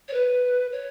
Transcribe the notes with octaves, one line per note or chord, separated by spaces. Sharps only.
C#5
B4
C#5